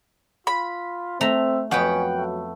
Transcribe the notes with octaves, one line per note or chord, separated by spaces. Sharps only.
F4 B5
A3 C4 E5 A#5
F2 F#3 B3 C#4 F#5 G5
A3